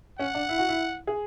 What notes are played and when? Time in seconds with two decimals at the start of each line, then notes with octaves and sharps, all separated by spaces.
0.19 C#4 F#5
0.35 D4
0.49 E4
0.58 F#4
0.69 E4
1.07 G#4